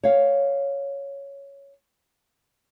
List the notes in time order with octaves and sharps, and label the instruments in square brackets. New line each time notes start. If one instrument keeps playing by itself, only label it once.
[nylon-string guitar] C#5 F5